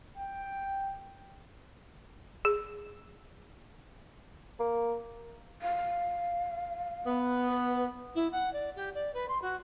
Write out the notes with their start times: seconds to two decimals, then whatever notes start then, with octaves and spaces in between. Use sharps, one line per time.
0.17 G5
2.45 G#4
4.60 A#3
5.62 F5
7.06 B3
7.49 B4
8.15 E4
8.32 F#5
8.53 D5
8.76 G4
8.94 D5
9.14 B4
9.28 C6
9.42 F#4